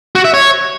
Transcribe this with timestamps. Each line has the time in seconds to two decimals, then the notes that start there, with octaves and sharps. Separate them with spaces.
0.15 F#4
0.24 E5
0.34 C#5